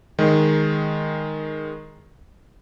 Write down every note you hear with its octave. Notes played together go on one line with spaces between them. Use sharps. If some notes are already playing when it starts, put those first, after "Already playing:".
D#3 G#3